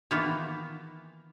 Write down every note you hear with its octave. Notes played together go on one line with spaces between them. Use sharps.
D#3 E3 A#3 B3 F4